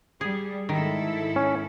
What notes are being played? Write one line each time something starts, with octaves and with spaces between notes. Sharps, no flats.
G3 G#4
G#2 D#3 E4 A4
C#4